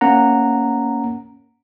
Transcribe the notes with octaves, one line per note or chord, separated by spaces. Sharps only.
A#3 C#4 F#5 A#5